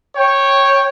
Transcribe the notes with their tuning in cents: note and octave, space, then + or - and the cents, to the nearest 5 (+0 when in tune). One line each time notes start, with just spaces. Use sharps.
C#5 -10 G5 +0